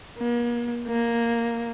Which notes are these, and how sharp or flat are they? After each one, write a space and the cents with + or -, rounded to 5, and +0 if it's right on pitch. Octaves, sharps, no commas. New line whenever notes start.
A#3 +40
A#3 +0